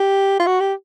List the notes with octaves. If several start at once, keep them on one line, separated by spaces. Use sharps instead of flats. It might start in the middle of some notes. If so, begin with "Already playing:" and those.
Already playing: G4
F4
F#4
G4